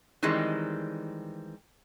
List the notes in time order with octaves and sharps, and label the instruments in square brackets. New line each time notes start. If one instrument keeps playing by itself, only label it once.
[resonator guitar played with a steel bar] D#3 E3 G3 G#3 C4